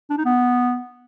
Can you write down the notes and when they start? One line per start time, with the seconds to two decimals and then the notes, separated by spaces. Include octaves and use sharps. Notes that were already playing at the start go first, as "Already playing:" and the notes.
0.10 D4
0.17 D#4
0.25 B3